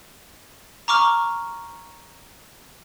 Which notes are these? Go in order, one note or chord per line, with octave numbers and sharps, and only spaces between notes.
A#5 C#6 D6 F6